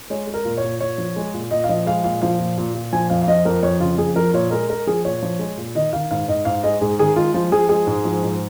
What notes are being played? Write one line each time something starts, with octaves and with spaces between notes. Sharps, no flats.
G#3 C#5
G#3
A#4
A#2
C#5
A#2
A#2 C#5
F3
G#3
A#2
A#2 D#5
F5
F3 D#5
G#3 F5
A#2 F5
F3 F5
A#2
A#2
A#2
F3 G#5
F2 F5
F5
F3 D#5
F2 A#4
F2 C#5
C#3 F4
F2 G#4
F3 A#4
A#2 C#5
G#3 A#4
G#3 A#4
F3 G#4
A#2 C#5
F3
G#3
A#2
D#3 D#5
D#3 F5
G#2 F5
G#2 D#5
G#2 F5
G#3 D#5
G#2 G#4
D#3 G#4
G#3 F4
F3 F4
F3 G#4
G#3 G#4
G#2
F3
G#2